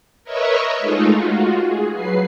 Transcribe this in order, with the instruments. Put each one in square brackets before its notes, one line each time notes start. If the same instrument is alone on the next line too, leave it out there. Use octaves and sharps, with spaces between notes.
[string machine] A#4 B4 C#5 D#5 E5 C#6
G#3 A3 D#4 F4
F4 F#4
G#4
F#3 B4 C7